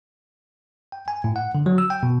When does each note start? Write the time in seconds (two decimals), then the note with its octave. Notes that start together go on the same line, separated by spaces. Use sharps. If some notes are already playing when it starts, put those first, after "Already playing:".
0.92 G5
1.08 G#5
1.24 A2
1.36 F#5
1.55 D3
1.66 F#3
1.78 E6
1.90 G5
2.03 B2